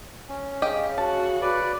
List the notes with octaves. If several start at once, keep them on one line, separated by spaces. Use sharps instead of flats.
C#4
C#3 G4 D#5
F#4 A5
B4 D5